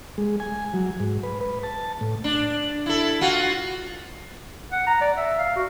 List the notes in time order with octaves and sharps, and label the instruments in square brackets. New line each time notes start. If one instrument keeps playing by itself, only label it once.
[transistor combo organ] G#3
G#5
F#3
G#2
B4
B4
A5
A2
[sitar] D4
E4 A4
F4 F#4
[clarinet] F#5
A#5
D5
E5
F5
F#4